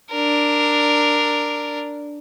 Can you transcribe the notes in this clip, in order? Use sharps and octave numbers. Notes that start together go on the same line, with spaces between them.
D4 A#4